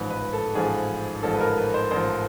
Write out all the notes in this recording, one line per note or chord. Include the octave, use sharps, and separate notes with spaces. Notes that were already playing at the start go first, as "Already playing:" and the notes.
Already playing: A1 G#2 F3 B4
B4
A4
A1 G#2 F3 G#4
A1 G#2 F3 A4
B4
A#4
B4
C5
A1 G#2 F3 C5